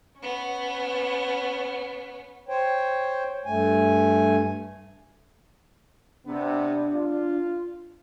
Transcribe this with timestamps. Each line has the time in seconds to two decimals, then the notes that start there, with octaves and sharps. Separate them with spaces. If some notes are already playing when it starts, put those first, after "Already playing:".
0.19 B3 C#4
2.49 C5 C#5 G5
3.46 G2 A3 G#5
6.26 C3 B3 D4
6.91 F4